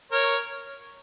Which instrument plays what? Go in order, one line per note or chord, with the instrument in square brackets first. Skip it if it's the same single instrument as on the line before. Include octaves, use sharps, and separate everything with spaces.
[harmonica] A#4 C#5